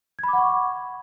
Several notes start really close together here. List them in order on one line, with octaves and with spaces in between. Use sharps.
G#6 B5 D6 F#5 C#6